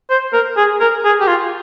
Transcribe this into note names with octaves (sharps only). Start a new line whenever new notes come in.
C5
A#4
G#4
A#4
G#4
G4
F4